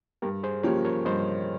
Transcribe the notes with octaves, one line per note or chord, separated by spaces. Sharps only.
G2 G4 A#4
G#4 C5
F3 A#3 C#4 G4 A#4 C#5
A#4 C#5
G2 C5 D#5